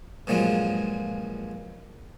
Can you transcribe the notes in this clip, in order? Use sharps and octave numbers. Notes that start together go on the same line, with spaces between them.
G2 A#2 F3 F#3 G#3